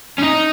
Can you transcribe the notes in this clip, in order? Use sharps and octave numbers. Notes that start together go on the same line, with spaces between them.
C#4
D#4